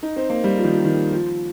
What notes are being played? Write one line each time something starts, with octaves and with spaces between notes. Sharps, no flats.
D#4
C4
A#3
G3
F3
D#3
F3
D#3
F3